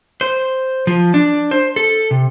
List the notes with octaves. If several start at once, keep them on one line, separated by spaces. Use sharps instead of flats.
C5
F3
D4
C5
A4
C3